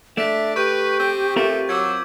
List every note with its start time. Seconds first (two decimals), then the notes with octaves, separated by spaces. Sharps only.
0.17 A3 D4 E5 B6 D7
0.56 G4 B4 C#6 G6 D#7
0.99 C4
1.36 A3 C4 F4 A#4
1.69 F#3 D6 E6 G#6